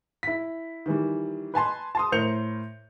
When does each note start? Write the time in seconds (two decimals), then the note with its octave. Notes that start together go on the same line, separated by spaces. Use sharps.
0.23 E4 B6
0.86 D#3 E3 G3
1.54 B4 G#5 A5 C6
1.95 A5 C6 D#6
2.12 A2 A#4 C5 G6 C#7 F7